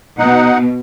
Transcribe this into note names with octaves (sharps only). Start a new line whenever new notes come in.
B2 D#4 F#5